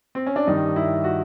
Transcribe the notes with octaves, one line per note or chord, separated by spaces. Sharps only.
C4
C#4
D4
G2 D#3 G3 D#4
E4
F#4